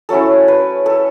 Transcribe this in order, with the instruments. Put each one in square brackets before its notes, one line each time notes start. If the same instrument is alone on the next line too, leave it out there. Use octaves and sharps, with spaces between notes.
[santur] F#3 A3 C#4 E4 A4
B4
A4